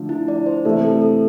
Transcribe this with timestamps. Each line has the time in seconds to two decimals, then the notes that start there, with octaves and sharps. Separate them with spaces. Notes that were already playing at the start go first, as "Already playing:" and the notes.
Already playing: D3 F3 A3
0.09 E4
0.28 D5
0.46 C5
0.65 C3 E3 A3 E4 A4
0.83 A4
1.02 A4